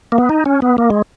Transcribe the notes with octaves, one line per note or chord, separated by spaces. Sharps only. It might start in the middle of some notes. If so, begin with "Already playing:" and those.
A#3
B3
D#4
C#4
B3
A#3
G#3